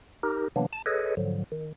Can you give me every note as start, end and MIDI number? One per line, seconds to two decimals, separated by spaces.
0.23 0.48 63
0.23 0.48 67
0.23 0.48 70
0.56 0.66 48
0.56 0.66 52
0.56 0.66 54
0.56 0.66 58
0.56 0.66 59
0.56 0.66 62
0.73 0.82 81
0.86 1.15 68
0.86 1.15 69
0.86 1.15 71
0.86 1.15 73
0.86 1.15 75
1.17 1.44 44
1.17 1.44 50
1.17 1.44 53
1.17 1.44 54
1.52 1.73 51